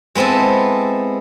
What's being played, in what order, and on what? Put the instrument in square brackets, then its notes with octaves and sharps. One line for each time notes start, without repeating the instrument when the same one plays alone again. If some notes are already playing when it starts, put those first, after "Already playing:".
[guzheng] G#3 B3 C4 E4 A4